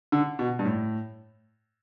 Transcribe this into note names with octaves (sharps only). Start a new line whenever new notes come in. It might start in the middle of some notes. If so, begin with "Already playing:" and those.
D3
B2
G2
A2